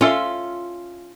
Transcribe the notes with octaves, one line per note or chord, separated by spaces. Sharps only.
C#4 F4 A4 E5